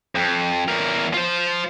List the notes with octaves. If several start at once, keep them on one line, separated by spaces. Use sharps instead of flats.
F2
E2 A#4
F4 C5